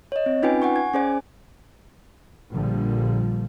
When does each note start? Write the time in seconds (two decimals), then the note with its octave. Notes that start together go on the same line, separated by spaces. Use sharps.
0.12 C#5 D#5
0.26 C4
0.42 C#4 D#4 F4 B4 G5 G#5
0.62 F#5 G#5 C#6
0.76 G#6
0.94 C#4 G#4 C5 D5 G#5
2.51 A#1 A#2 D3 F3 G3